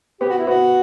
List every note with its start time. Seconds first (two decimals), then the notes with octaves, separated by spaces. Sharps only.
0.20 B3 G4
0.29 F#4
0.39 E4
0.47 B3 F#4